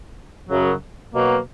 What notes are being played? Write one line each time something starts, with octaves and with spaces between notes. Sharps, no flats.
F#2 C#3 F#3
B2 F#3 A#3